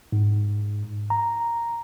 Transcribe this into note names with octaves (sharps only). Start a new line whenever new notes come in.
G#2
A#5